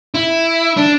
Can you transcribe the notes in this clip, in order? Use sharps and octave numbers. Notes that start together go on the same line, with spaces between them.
E4
D4